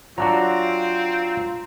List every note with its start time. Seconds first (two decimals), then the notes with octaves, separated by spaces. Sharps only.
0.18 F#3 C4 D4 F4 F#4 A#5